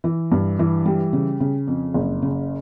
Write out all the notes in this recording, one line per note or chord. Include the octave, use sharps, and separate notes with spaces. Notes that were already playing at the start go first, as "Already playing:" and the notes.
E3
G2
E3
G3
C#3
C#3
F2
F#1
C#3